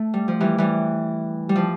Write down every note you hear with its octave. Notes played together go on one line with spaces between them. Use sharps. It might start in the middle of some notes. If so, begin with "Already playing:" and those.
Already playing: A3
G3
F3
E3 G3
E3 G3
G3
F3